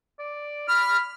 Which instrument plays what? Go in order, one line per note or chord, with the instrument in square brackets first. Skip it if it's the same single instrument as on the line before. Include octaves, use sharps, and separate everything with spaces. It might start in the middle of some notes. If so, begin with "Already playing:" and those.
[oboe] D5
[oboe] B5 [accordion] F6